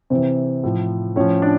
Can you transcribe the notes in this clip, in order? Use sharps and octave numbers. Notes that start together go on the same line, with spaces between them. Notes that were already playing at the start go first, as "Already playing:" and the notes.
C3 E3 C4 C5
A2 F3
A2 F3 C#4 C#5
D4 D5